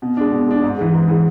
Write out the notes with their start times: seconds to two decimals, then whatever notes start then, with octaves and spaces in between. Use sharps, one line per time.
0.02 B2
0.17 G#3 D4
0.32 B2
0.48 G#3 D4
0.63 G#2
0.78 E3 G#3
0.94 G#2
1.08 E3 G#3